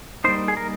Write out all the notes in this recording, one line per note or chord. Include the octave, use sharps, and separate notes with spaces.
G3 A#3 D#4 C5
G#4
A#4